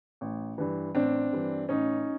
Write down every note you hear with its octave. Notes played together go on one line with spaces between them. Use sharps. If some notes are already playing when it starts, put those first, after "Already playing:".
A1
G2 E3
A1 C4 D4
G2 E3
A1 C#4 D#4